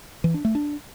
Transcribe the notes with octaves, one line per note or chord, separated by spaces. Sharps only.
E3
D4
A3
D4